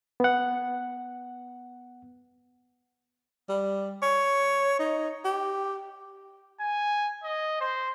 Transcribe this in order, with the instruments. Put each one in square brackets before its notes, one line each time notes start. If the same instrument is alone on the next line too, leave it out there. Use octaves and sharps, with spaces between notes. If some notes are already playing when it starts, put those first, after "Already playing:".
[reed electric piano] B3 F#5
[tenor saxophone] G3
C#5
D#4
G4
[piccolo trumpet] G#5
D#5
C5